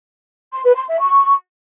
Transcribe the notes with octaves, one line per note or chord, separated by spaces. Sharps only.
C6
B4
C6
E5
C#6